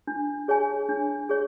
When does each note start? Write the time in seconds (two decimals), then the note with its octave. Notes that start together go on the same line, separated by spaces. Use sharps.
0.07 D4
0.48 G#4 C#5 G#5
0.89 D4
1.29 G#4 C#5